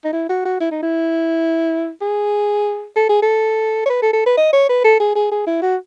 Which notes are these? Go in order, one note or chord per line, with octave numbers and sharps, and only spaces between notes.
D#4
E4
F#4
F#4
E4
D#4
E4
G#4
A4
G#4
A4
C#5
B4
A4
A4
B4
D#5
C#5
B4
A4
G#4
G#4
G#4
E4
F#4